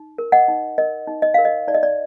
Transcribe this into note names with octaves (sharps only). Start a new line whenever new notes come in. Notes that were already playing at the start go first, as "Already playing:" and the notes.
Already playing: D#4
A#4
D#5 F#5
D#4
A#4 D#5
D#4
D#5
A#4 F5
D#5
D#4 D5
D#5
D5